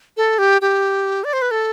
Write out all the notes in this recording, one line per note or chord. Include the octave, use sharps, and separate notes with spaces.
A4
G4
G4
D5
C5
B4
A4